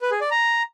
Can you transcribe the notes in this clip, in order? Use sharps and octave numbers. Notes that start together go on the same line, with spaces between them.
B4
G#4
D5
A#5